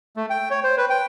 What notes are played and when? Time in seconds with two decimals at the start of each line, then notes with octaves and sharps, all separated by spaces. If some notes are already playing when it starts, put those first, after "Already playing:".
0.16 A3
0.30 G5
0.51 C#5
0.64 C5
0.77 B4
0.90 G5